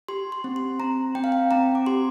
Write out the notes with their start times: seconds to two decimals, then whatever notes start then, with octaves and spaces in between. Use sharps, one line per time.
0.08 G4 C6
0.32 C6
0.44 C4
0.56 C6
0.80 C4 A#5
1.15 C4 G5
1.24 F5
1.32 G5
1.51 C4 A#5
1.75 D6
1.86 G4 C6